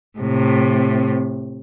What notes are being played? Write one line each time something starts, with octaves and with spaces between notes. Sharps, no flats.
A2 C3